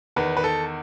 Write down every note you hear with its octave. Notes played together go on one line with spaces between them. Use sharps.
E2 D#3 B4
B4
A4